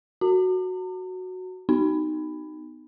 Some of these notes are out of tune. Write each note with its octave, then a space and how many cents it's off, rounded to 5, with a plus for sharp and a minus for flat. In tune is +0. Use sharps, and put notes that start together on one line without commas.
F#4 +0 A#5 -45
B3 +25 D#4 -15